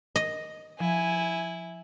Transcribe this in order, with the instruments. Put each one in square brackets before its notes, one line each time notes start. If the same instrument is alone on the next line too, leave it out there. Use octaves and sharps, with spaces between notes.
[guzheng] D#5
[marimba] F3 [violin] E4 [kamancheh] G#5